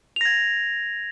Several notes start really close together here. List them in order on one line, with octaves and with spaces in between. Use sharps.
F7 A#6 G#6